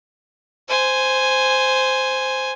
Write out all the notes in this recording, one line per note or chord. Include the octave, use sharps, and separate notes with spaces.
C5 G#5